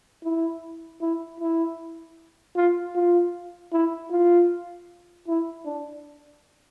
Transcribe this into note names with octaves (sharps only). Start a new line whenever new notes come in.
E4
E4
E4
F4
F4
E4
F4
E4
D4